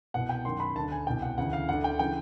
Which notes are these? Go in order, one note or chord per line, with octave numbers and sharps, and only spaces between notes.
C2 B2 F#5
G5
F#2 D#3 C6
B5
D2 D3 A5
G#5
C2 B2 G5
F#5
D2 C#3 E3 F#5
F5
D2 D3 F#5
G5
C#3 E3 G5